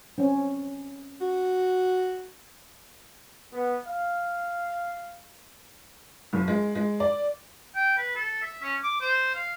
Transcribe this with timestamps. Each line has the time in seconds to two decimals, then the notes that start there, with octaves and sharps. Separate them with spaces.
0.18 C4 C#4
1.21 F#4
3.53 B3
3.86 F5
6.33 F#1
6.48 G#3
6.75 G#3
7.00 D5
7.75 G5
7.97 B4
8.15 A4
8.42 E5
8.62 C#4
8.83 D6
9.00 C5
9.35 F5